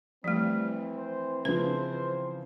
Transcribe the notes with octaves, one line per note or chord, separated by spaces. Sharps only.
E3 F3 G3 A3 C4
C5
C#3 F3 B4 C5